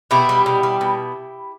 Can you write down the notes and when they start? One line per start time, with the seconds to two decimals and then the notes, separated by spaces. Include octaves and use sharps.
0.11 B2 E4 G4
0.29 G3
0.46 B2
0.63 G3
0.81 B2